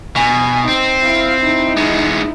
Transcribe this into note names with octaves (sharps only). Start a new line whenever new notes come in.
B2 G#5
C4 D#4
E4 F5
D#4 E4
G#3 B3